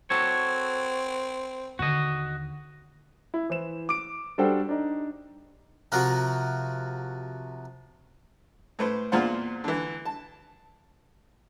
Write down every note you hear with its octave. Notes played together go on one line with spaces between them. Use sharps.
C4 F#4 A4 C#5
D#2 D3 F#4 D#5
E4
E3 C5 E7
D6 D7
G3 D4 F#4 A4 C5 G5
D4 D#4
C3 F3 F4 F#4 A#4
A2 B4 C5
E2 A#2 F4 C5 F#5
D3 E3
A5